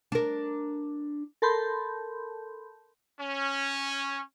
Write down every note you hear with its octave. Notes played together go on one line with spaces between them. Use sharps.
D4 A#4
A4 A#4 A5 B5 C6 G6
C#4